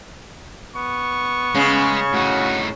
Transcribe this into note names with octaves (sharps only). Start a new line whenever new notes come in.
B3 C#6
C#3 G#3
A2 D#4 F#4